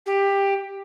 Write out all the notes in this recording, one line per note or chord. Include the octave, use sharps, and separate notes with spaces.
G4